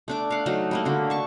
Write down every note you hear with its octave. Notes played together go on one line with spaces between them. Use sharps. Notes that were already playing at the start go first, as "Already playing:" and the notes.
A3 D4 D6
F5 F#5
F#3 A3 D#4
G3 A3 A#3
D3 F#4
A5 C#6